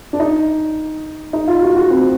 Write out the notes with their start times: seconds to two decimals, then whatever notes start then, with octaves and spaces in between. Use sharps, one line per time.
0.13 D4
0.20 D#4
1.33 D#4
1.48 F4
1.62 F#4
1.76 F#4
1.90 C4